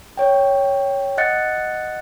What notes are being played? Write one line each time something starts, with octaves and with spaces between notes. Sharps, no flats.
C#5 G5
D#5 F#5 F#6 A6 C#7